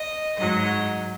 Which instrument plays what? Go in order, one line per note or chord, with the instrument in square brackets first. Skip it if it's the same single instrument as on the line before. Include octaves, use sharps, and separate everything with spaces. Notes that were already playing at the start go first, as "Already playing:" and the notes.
Already playing: [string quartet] D#5
G#2 F#3 D#5